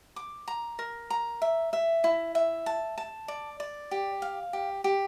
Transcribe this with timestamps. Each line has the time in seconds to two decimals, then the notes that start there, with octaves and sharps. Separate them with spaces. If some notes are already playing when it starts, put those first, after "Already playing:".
0.16 D6
0.48 A#5
0.79 A#4
1.10 A#5
1.42 E5
1.73 E5
2.04 E4
2.35 E5
2.66 A5
2.98 A5
3.28 D5
3.60 D5
3.91 G4
4.22 F5
4.53 G4
4.84 G4